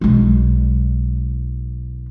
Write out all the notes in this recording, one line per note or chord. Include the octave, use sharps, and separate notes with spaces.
B1 G#3